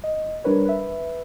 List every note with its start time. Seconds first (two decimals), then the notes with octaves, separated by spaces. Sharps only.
0.04 D#5
0.44 G3 D4 A#4 B4 C#5
0.65 B4 E5